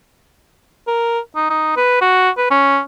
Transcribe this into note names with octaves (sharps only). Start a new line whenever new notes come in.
A#4
D#4
D#4
B4
F#4
B4
C#4